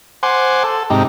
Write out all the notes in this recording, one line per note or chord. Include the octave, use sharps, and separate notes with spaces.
C5 F#5 G#5 C6 D6
A4
G#2 C3 D#4 G4